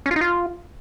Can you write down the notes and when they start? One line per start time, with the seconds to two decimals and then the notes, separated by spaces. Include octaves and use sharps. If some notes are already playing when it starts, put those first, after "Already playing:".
0.06 C#4
0.11 F4
0.16 D#4
0.21 F4